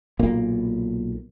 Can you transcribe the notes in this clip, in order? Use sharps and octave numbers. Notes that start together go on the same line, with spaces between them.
B1 A#2 A#3